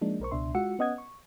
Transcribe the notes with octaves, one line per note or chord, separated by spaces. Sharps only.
F3 G#3 A#3 D4 D#4
B1 A#4 C5 C#6
C#2 B2 D4 E5 C6
G#3 F4 F#4 F#5 E6 C#7
B3 C#4 D#5 F#5 D#6 G#6
C#6